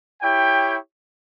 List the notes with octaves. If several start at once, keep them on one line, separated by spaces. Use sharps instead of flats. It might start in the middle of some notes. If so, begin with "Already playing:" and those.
E4 G4 C#5 G5